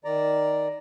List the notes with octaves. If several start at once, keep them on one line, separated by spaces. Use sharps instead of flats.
D#3 D5 A#5